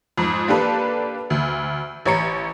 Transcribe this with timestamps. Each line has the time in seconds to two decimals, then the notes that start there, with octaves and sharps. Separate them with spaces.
0.18 F2 G#2
0.48 A#3 D4 G4 A4 B4
1.30 D2
2.06 A1 C#5 A#5 C#7